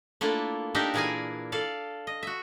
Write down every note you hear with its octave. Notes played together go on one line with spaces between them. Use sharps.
A3 A#3 D4 E4 F4
D4 D#4 G4 A#4 E5 G5
A#2 E3 E4 G#4 A#4 G#5
A4 D5 F5
D#5
F#4 E5